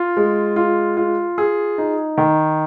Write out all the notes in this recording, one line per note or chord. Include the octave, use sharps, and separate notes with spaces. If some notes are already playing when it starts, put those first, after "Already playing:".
Already playing: F4
G#3
F4
F4
G#4
D#4
D#3